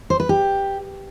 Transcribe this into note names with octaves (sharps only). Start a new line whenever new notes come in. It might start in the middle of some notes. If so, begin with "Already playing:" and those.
C5
B4
G4